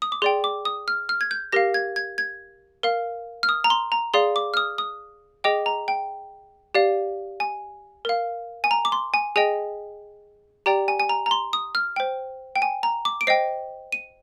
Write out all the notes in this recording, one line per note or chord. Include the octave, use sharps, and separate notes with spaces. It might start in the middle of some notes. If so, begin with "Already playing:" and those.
D#6
D6
G#4 D5 G5 C6
D6
D#6
F6
F6
G#6
G6
G4 A#4 F5 A#6
G#6
G#6
G#6
A#4 F5
F6
D#6
A#5
C6
A#5
G#4 D5 F5 C6
D6
F6
D#6
D#6
G#4 D#5 G5 D6
A#5
G5
G4 D5 F5
G#5
A#4 F5
G#5
A#5
D6
C6
G#5
G#4 D#5 G5 G#5
G4 D5 G5 A#5
G#5
G#5
A#5
A#5
C6
D#6
F6
C5 G5
G5
G#5
A#5
D6
D7
C5 D#5 G5 C7
D#7